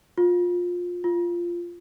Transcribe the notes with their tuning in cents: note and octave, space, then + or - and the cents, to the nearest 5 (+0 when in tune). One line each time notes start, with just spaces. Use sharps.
F4 +20
F4 -10